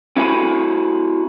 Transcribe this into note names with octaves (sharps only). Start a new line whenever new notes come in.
C4 E4 F#4 G#5 B5